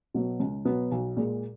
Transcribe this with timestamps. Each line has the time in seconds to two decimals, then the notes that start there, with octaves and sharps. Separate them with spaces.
0.14 B2 F#3 B3
0.40 C#2
0.65 B2 F#3 B3
0.92 B1
1.17 A#2 G#3